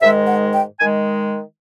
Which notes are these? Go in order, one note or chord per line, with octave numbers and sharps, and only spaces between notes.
G#2 D#3 G#3 E5
F#5
G5
D#3 G#3 G#5